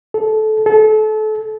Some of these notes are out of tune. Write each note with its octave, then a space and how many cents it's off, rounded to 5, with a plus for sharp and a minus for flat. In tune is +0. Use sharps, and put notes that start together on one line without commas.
A4 -20
A4 -30